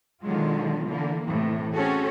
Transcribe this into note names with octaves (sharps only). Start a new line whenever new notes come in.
B2 D3 D#3 F#3 G#3 F4
D3 E3 A#3
A2 C3 E3
C4 C#4 F#4 G#4 A4